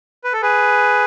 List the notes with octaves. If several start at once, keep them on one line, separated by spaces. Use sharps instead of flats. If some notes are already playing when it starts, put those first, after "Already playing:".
B4
A4
G#4 B4